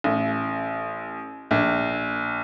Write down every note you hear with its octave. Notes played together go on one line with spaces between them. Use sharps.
A1
A#1